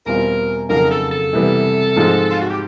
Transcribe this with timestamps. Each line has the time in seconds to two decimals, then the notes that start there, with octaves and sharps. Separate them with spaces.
0.06 E2 B2 G3 C4 F4 A#4
0.69 F2 C#3 F#3 A#3 D#4 A#4
0.91 A4
1.12 A4
1.33 C3 E3 G3 B3
1.96 G#2 F3 G#3 C4
2.31 F4
2.41 F#4
2.50 G4